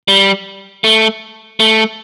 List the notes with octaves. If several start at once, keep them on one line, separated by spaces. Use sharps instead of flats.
G3
A3
A3